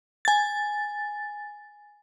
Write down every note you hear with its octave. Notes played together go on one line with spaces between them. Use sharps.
G#5 A6